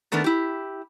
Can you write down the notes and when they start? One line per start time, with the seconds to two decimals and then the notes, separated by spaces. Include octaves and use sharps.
0.12 D#3 A3 B3 D4 A#4
0.24 E4 G4